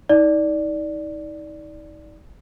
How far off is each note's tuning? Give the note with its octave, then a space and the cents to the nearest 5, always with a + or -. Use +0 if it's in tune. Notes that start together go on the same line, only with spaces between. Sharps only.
D#4 +30 D5 +0